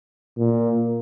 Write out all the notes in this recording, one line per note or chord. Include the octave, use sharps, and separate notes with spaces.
A#2